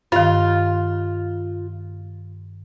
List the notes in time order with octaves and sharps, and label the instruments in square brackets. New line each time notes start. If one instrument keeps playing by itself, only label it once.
[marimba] G2 D#3 [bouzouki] F4